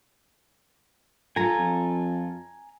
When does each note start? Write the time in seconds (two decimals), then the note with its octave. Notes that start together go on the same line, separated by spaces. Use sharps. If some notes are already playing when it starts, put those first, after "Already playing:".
1.36 F4 A4 G#5 A#5
1.58 F2